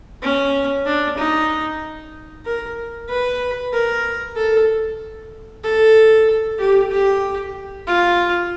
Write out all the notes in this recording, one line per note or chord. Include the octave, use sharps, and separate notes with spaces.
C#4
D4
D#4
A#4
B4
A#4
A4
A4
G4
G4
F4